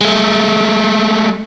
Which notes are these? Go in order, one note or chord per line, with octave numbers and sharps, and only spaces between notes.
G#3 A3